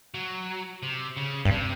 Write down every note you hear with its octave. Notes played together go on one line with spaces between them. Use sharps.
F#3
C3
C#3
G2
C3